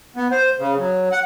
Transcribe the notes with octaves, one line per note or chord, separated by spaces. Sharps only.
B3
C5
C#3
F#3
F#5